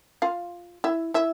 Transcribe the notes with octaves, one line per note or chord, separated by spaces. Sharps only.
F4 F5
E4 E5
E4 E5